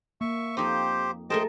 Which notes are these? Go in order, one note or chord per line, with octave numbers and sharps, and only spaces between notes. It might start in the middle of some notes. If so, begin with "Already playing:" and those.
A#3 E5 C#6
F2 D#4 G4 C5
A3 F#4 G#4 A#4 C5 D#5 G5 A5